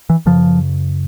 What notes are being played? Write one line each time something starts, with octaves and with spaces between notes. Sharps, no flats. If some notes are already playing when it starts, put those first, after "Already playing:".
E3
F#2 C#3 F3